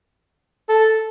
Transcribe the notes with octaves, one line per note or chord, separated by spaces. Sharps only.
A4